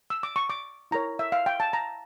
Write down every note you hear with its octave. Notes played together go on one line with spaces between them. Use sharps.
E6
D6
C#6
D6
E4 A#4 C#5 A#5
E5
F5
G5
A5
A#5